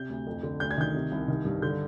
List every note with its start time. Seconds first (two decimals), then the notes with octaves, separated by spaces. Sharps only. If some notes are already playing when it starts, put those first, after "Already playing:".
Already playing: C3 G6
0.10 D2
0.27 F2
0.43 D3
0.60 D2 G6
0.71 G#6
0.78 D#3 G6
0.94 C3
1.11 C2
1.28 D#3
1.45 G2
1.62 D3 G6